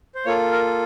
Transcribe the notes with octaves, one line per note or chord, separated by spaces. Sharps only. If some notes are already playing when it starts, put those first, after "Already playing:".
C5
A#3 F4 A4 C#5
A#4